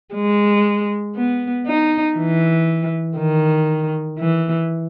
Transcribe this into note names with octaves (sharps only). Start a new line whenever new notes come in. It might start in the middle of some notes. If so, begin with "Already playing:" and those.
G#3
B3
D#4
E3
D#3
E3